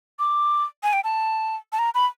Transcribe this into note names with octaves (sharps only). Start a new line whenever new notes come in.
D6
G#5
G5
A5
A5
A#5
B5